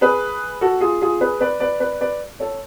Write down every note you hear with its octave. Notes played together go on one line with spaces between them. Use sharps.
G#4 B4
F#4 A4
F4 G#4
F4 G#4
G#4 B4
B4 D5
B4 D5
B4 D5
B4 D5
A4 C#5